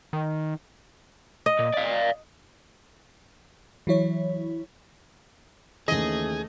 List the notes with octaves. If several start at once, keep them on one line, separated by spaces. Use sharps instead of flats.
D#3
D#5
A#2
D5 F5
E3 F#3 E4 C#5
D#2 C#3 E3 A3 G#4 D#5